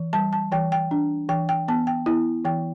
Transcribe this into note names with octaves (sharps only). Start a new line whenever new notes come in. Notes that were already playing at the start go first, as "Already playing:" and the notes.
Already playing: E3
G3 A5
A5
E3 G5
G5
D4
E3 G5
G5
B3 A5
G5
B3 E4
E3 G5